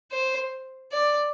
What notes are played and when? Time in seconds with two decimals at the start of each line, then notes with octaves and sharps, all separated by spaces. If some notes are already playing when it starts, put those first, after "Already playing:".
0.12 C5
0.92 D5